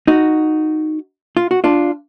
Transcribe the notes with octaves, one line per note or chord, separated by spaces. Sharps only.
D#4 F#4
F4
F#4
D4 F4